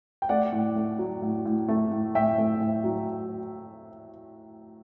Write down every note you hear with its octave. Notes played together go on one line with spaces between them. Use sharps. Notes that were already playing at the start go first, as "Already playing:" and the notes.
G5
A3 D5 F#5
A2
A3
F#3
A2
A2
A3
A2
A2 E5 G5
A3
A2
F#3